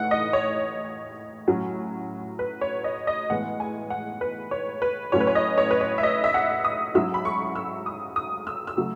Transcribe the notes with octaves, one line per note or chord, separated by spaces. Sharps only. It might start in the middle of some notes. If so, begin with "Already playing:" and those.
Already playing: A2 E3 A3 D#4 F#5
D#5
C#5
A2 F#3 C#4
B4
C#5
D#5
D#5
A2 E3 G#3 B3 F#5
G#5
F#5
B4
C#5
B4
A2 F#3 A3 C#4 C#5
B4
C#5
D#5
C#5
B4
C#5
E5
D#5
E5
F#5
D#6
G#2 F#3 C#4 E4 E6
B5
C#6
E6
D#6
D#6
E6
E6
C#3 F#3 A3